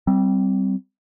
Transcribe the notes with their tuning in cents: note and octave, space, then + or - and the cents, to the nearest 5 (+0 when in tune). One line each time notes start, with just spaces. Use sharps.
G3 -20 C4 -5